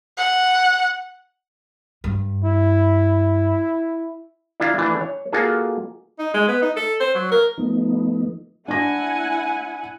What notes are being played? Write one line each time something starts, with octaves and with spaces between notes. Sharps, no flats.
F#5
G2
E4
D4 E4 F4 E5 A#5
E3 A3 D4
C#5
A#3 F4 F#4 G#4 A4
D#4
G#3
B3
D#4
A4
C5
F#3
A#4
F3 A3 B3 D#4
D4 E4 F#5 G#5 A#6